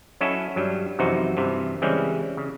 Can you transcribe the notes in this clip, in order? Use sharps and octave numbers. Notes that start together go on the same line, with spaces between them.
F#3 C#4 E4 F#4 A4 D#5
G2 F#3 G3
F#2 C3 E3 F3 D#4 F#4
G2 C3 E3
C#3 E3 G3 G#3 C4 C#4
C#3